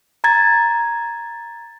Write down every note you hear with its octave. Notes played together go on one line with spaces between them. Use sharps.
A#5 G#6 A6